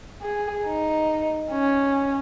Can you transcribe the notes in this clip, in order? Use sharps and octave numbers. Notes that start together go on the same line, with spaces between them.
G#4
D#4
C#4